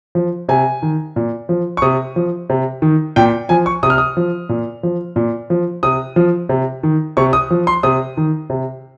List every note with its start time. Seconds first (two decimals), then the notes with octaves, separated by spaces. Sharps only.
0.15 F3
0.49 C3 G#5
0.82 D#3
1.16 A#2
1.49 F3
1.77 C#6
1.82 C3 D#6
2.16 F3
2.50 C3
2.82 D#3
3.16 A#2 G5
3.49 F3 G#5
3.66 C#6
3.83 C3 D#6
3.90 F6
3.98 D#6
4.17 F3
4.49 A#2
4.83 F3
5.16 A#2
5.50 F3
5.83 C3 D#6
6.16 F3
6.49 C3
6.83 D#3
7.17 C3 C#6
7.33 D#6
7.51 F3
7.67 C6
7.83 C3 D#6
8.17 D#3
8.50 C3